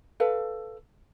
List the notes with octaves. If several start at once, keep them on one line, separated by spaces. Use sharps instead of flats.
A4 B4 F5